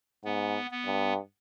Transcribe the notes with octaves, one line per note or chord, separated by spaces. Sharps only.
G#2 B3
B3
G2